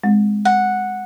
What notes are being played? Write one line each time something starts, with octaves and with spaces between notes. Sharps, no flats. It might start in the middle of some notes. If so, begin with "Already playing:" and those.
G#3 C4
F#5